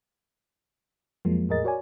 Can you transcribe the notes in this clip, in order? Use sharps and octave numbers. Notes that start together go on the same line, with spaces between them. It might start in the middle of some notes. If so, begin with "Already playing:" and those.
F2 F3 F#3 G#3 A#3
E2 A2 G#4 A#4 D#5 A6
F#4 A#4 C#5 D5 G#5